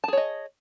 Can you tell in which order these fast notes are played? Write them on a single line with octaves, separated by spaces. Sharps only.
A5 G#4 C#5 D#5